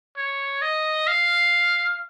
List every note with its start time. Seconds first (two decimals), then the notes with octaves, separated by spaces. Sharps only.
0.17 C#5
0.62 D#5
1.07 F5